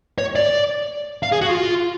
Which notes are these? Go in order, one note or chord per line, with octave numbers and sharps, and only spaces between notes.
C#5
D5
F5
G#4
F#4
F4